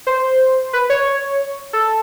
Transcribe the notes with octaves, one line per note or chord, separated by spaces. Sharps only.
C5
B4
C#5
A4